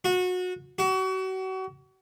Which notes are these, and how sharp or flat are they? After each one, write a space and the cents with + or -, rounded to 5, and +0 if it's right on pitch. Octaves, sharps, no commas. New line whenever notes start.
F#4 -25
F#4 +35